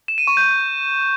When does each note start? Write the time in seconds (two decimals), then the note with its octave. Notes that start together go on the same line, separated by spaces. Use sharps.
0.08 E7
0.18 D#7
0.27 C#6
0.37 G6